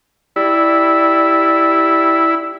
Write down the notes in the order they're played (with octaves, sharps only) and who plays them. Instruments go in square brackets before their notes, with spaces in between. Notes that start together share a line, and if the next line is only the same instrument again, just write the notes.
[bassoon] G3 [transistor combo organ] E4